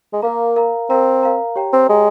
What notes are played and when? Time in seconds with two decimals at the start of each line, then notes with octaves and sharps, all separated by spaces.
0.13 G#3
0.22 A#3 A#4 F5 A#5
0.56 A#4 F5 A#5
0.90 C4 A#4 F5 A#5
1.23 A#4 F5 A#5
1.56 G4 C#5 G5 A#5
1.73 C4
1.89 G#3 G4 C#5 G5 A#5